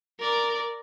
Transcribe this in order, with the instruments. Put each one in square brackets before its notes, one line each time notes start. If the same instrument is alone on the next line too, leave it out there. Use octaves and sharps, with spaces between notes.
[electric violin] A#4 D5